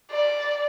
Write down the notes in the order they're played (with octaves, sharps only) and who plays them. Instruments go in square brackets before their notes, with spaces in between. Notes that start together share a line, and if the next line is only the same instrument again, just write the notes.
[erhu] D5